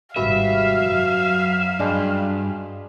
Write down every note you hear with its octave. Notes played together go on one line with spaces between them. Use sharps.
G#1 C3 G3 F#4 B4 E5 F5
F#2 F#3
G2 G#3 D4